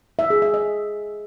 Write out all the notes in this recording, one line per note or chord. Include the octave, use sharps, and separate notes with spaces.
E5
G#4
E5
D#5